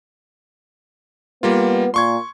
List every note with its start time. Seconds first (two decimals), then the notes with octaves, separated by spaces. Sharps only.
1.43 G3 A#3 B3 F4
1.94 A#2 C6 C#6 G#6